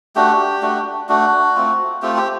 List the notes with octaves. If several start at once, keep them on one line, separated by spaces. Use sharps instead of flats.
A3 D4 F#4 G4
A3 D4 F#4
A3 D4 F#4
A3 C4 F4
A3 C4 F4 G4
G4